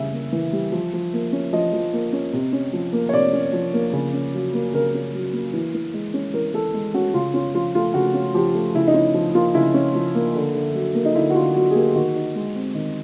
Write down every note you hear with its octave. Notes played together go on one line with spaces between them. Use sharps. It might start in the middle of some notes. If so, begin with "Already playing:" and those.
Already playing: C#3 E3 G3 E5
A#3
E3
G3
F3
F3
A#3
C#4
F3 D#5
F3
A#3
C#4
C3
C#4
F3
A#3
C#5
C3 D5
C#4
F3
A#3
C#3
C#4
F#3
A#3
C#3 A#4
C#4
F#3
A#3
E3
E3
G#3
C#4
E3 A#4
E3 A4
G#3
C#4 F#4
C#3 F4
C#4 F4
F3 F4
A3 F4
C#3 F#4
C#4
F3 G4
A3
C#3 E4
D#4
C#4 E4
F3
A#3 F4
C#3 E4
C#4
F3
A#3
D3
D3
F#3
A#3
D#4
D3 E4
F#4
D3 F4
F#3 F#4
G#4
A#3 G4
D#3 F#4
D#4
G#3
C4
D#3